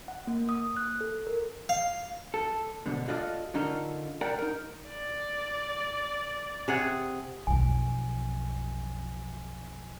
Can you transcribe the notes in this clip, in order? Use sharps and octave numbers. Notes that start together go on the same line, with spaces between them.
F#5
A#3
D#6
F#6
A4
A#4
F5
A4
G#2 B2 D3
F4 F#4 A4 D5 D#5 F5
D3 C#4 D#4 F4 A4 A#4
A#4 D5 F#5 G5 A#5
D#4 A#4
D5
C3 G#4 F#5
B1 F2 G#5